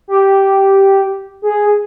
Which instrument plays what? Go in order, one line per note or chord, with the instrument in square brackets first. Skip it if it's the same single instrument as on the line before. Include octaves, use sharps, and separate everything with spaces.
[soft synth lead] G4
G#4